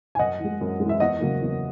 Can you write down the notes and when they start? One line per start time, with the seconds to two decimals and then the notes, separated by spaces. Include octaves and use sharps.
0.15 G#5
0.19 F#2 D#5 F#5
0.39 E3
0.45 G#3
0.61 F#2
0.80 G#3
0.85 E3 E5
1.00 E2 D#5 F#5
1.20 C#3 F#3 A#3
1.41 E2